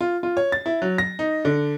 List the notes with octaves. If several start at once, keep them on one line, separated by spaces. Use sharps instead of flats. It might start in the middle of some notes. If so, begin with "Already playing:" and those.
F4
F4
C#5
A6
E4
F#3
A#6
D#4
D3